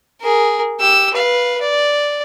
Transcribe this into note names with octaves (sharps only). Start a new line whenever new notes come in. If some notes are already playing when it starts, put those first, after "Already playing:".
G#4 A#4
G4 E6
B4 F5
D5